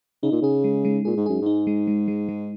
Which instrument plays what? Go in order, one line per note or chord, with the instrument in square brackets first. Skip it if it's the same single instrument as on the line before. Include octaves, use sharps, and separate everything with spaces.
[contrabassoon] C#3 [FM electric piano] D#4
[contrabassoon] A#2
[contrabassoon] C#3 [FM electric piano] G#4
[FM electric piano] G#3
G#3
[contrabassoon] A#2 [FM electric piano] G#4
[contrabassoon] G#2
[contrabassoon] F#2 [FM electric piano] G#4
[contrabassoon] G#2 [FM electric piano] D#4
[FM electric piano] G#3
G#3
G#3
G#3